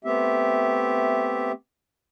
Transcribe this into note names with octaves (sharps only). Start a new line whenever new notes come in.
A3 B3 C4 G4 E5